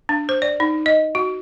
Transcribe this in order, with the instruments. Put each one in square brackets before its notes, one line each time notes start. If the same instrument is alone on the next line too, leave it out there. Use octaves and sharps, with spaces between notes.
[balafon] D4
C5
D5
D#4
D#5
F#4